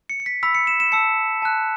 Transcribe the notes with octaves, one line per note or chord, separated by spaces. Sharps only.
C#7
C#7
B6
B5 E6 B6
C#7
E7
E7
A5 E6 C#7
A5 F#6